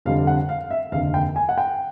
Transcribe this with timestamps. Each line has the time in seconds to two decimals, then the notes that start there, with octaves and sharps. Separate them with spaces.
0.05 F1 F2 D3 G3 F5
0.27 F#5
0.49 F5
0.71 E5
0.92 F1 D#2 D3 F5
1.14 G5
1.36 G#5
1.49 F#5
1.58 G5